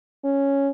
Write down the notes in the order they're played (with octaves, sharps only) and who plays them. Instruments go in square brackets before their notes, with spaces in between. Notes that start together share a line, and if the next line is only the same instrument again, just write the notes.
[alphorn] C#4